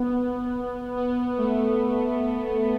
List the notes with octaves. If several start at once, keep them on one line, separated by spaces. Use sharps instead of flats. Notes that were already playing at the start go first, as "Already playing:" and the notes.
Already playing: B3
B3
A3